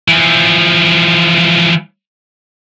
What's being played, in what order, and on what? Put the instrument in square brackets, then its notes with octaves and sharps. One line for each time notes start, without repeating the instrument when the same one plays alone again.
[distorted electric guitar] E3 F3